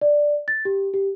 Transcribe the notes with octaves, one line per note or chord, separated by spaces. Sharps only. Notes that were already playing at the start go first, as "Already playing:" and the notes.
D5
A6
G4
G4